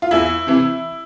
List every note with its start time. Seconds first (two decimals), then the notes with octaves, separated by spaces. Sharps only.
0.02 F4
0.11 E2 E4
0.47 C3 E3